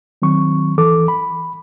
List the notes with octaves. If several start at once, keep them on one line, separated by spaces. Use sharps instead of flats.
D#3 F#3 C4 C#6
C#2 E3 A4 D6
B5